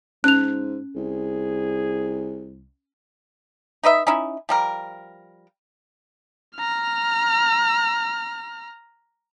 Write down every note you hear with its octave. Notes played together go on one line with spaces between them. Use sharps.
G#2 C#4 F#6 F7
C2 G#4
D#4 B4 D#5 E5
C#4 D#4 E4
F3 G3 A#4
A#5 F6